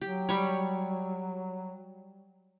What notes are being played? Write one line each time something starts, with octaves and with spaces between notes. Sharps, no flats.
F#3 G4
G3 C#5